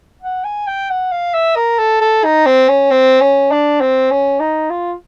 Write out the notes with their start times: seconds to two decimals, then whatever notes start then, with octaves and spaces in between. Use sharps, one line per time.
0.22 F#5
0.44 G#5
0.67 G5
0.90 F#5
1.12 F5
1.34 E5
1.56 A#4
1.78 A4
2.01 A4
2.24 D#4
2.46 C4
2.68 C#4
2.91 C4
3.21 C#4
3.51 D4
3.81 C4
4.11 C#4
4.40 D#4
4.70 F4